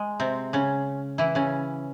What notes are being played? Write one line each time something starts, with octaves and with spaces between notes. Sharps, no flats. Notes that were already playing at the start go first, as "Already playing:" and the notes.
Already playing: G#3
C3 C4
C#3 C#4
E3 E4
C#3 C#4